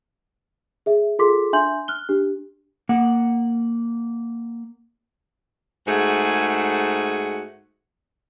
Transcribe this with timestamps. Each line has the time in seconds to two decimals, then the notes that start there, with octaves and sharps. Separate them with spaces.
0.86 G#4 E5
1.19 F4 G#4 A4 C6 D6 B6
1.53 D4 E5 G#5 C6 G6 F#7
1.88 F6 F#6 G7
2.09 D4 G4
2.89 A#3 F#5
5.86 G#2 A3 F#4 G#4